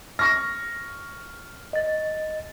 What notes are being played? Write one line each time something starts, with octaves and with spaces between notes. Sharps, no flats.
C#6 F6 A#6
D#5 A6